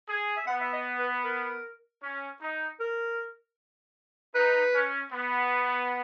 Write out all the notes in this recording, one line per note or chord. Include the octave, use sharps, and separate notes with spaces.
G#4
E5
B3 F#5
E5
D#5
B4
A#4
C#4
D#4
A#4
D#4 B4
C#4
B3